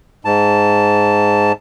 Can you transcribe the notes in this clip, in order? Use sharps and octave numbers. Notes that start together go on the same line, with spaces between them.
G#2 A5